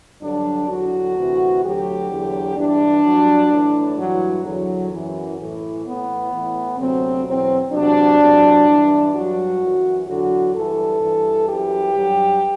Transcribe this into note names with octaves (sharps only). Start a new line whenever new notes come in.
G2 D3 F#3 D4
E2 D3 F#3 F#4
D2 C3 E3
D2 D3 F#3 G4
E2 D3 F#3
G2 E3 D4
G2 F#3
A2 E3
G2 E3 F#3
E2 D3 F#3
F#2 E3
A2 E3
A2 E3 B3
A2 E3
D2 C3 F#3 C4
E2 B2 F#3 C4
E2 C3 F#3 D4
E2 C3 F#3
G2 E3
G2 F#3 F#4
F#2 E3
E2 D3 F#3 F#4
G2 E3 A4
G2 E3
F#2 E3 G4
G2 F#3